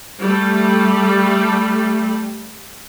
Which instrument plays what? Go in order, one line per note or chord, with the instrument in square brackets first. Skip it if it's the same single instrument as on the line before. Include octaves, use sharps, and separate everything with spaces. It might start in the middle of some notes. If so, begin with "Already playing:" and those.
[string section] G3 A3